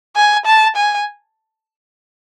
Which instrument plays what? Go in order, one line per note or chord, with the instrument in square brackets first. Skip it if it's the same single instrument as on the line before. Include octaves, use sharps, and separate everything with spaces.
[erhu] G#5
A5
G#5